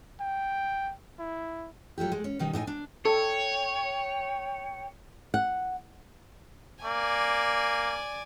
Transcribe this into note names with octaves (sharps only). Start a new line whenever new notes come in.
G5
E4
F#3 A3 F4 G4
G#3 A3
C#4
B2 D#3 G3 D#4
A2 D#4 E5 G#5
D4
A4 C#5 G5
F#5
A#3 D5 G#5